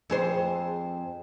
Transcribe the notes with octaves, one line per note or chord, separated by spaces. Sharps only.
F2 G#4 C5